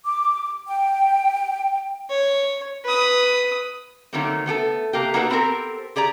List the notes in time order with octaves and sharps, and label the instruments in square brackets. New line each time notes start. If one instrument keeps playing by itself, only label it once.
[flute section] D6
G5
[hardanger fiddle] C#5
B4 D#6
[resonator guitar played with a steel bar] D3 D#3 F#3 A3 A#3 C4
A3 B3 G4 A4
C3 A#3 G4
A#3 D#4 F#4 G4 A4 B4
B3 C4 G4 A4 A#4
G4 G#4 D5 A#5